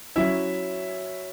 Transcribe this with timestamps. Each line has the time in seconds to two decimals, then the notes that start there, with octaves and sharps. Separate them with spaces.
0.16 F#3 C#4 E4 E5